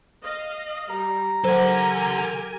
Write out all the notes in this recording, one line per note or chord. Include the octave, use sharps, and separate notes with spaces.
D#5 F5
G3 A#5
F#3 G4 A4 A#4 C5 F#5 G#5